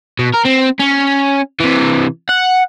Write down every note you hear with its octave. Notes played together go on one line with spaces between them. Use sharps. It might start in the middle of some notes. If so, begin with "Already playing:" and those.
B2
A#4
C4
C#4
C3 E3
F#5